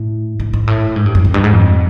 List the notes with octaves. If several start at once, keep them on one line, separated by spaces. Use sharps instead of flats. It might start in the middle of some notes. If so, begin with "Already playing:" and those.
Already playing: A2
G#2
G#2
A2
G#2
G2
F#2
F2
G2
G#2
F2